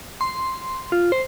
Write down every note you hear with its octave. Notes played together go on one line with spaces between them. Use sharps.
C6
F4
C5